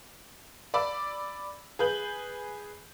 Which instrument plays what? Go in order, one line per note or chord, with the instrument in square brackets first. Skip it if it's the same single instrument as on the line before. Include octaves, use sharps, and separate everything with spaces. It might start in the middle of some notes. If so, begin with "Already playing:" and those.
[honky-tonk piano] D5 B5 D6 E6
G#4 B4 G6 F#7